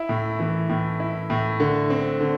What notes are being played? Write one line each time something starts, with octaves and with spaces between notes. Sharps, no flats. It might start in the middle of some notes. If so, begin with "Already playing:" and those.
Already playing: E4
A2
E3
A2
E4
A2
D3
C4
D3